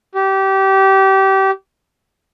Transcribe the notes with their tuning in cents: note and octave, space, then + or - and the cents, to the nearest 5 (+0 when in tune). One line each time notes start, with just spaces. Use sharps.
G4 -25